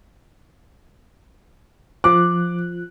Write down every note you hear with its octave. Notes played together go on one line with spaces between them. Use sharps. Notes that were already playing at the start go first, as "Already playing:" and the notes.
F3 D6 F#6